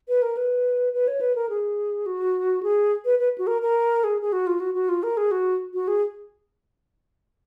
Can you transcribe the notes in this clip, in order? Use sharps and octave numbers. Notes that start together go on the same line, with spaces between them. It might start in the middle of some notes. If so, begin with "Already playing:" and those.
B4
A#4
B4
B4
C#5
B4
A#4
G#4
F#4
G#4
B4
B4
F#4
A#4
A#4
G#4
G#4
F#4
F4
F#4
F#4
F4
A#4
G#4
F#4
F#4
G#4